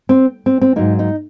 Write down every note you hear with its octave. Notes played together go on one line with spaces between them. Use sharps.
C4
C4
C4
G#2 F#3 A#3 D#4
D#4